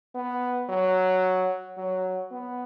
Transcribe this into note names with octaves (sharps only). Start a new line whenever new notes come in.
B3
F#3
F#3
B3